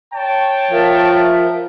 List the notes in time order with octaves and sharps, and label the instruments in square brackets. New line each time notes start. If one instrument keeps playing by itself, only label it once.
[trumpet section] C#5 G5 A5
[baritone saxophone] F3 [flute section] A#4 E5